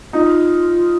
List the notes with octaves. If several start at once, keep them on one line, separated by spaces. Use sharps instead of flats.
D#4 F4